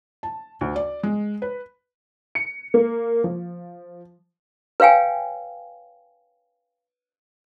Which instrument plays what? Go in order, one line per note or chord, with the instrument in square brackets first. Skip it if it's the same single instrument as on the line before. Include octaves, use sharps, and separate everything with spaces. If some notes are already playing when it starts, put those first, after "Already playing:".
[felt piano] A5
D2
D5
G#3
B4
[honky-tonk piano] C#7
A#3
F3
[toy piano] B4 C#5 F5 G5 G#5